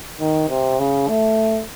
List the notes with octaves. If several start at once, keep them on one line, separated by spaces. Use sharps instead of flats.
D#3
C3
C#3
A3